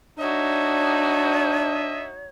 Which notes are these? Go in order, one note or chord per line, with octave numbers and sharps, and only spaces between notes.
D4 D#4 F#4 C#5 D#5 E5